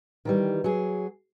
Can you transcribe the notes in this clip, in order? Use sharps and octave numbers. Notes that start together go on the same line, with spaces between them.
D#3 E3 G3
F#3 G#4